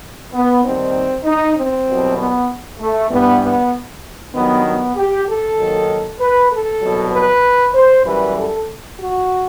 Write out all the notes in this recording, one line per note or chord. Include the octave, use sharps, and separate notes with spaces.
B3
D#2 D#3 G3 C4
D#4
C4
C2 B2 F#3
B3
A3
G2 E3 G3 B3
B3
G2 D#3 F#3 B3
B3
G4
A4
D#2 D#3 F#3
B4
A4
C2 B2 F#3
B4
C5
F#2 E3 G3 B4
A4
F#4